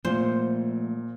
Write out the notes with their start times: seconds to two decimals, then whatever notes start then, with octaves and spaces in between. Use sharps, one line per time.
0.05 A#2 F3 A3 C5